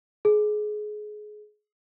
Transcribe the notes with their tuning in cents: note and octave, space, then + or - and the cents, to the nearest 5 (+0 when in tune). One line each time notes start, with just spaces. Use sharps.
G#4 +25